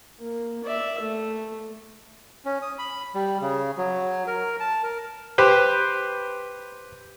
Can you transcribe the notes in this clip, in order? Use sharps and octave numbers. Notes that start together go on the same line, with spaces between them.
A#3
D5 E5
A3
C#4
D#6
B5
G3
C#3
F#3
A#4
A5
A#4
G4 B4 C5